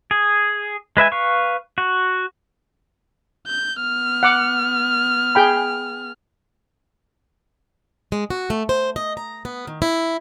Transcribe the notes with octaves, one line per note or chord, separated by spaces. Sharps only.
G#4
G#3 B4 E5 G#5
B4 F5 C#6
F#4
G6
B3 F6
F#5 D6
G#4 G5 B5
G#3
F#4
A3
C5
D#5
A#5
B3
D#3
E4